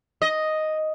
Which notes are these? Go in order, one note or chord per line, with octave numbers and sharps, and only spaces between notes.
D#5